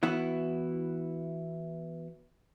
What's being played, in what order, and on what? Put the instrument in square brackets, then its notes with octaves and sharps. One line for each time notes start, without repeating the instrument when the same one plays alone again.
[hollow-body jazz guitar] E3 B3 E4 F#4